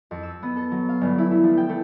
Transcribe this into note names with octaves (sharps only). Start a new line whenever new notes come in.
F2
E6
B3
A4
F#3
F5
G1
E4
A3
F3
G5
A3